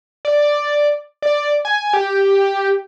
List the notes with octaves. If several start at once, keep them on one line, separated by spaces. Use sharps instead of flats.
D5
D5
G#5
G4